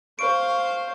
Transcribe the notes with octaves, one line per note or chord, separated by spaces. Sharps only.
C5 F5 C#6 D7